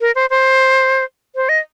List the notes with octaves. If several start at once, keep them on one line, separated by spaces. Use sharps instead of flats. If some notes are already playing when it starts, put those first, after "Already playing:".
A#4
C5
C5
C5
D#5